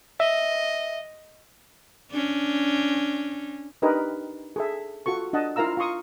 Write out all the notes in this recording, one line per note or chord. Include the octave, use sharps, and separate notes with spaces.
D#5 E5
C#4 D4
D4 D#4 G4 A#4 B4 D#5
G#4 A4 E5
F4 F#4 A4 C#6
D4 D#5 F#5 A5
E4 F4 A#4 F5 A#5 E6
F4 A#5 C6 C#6 D#6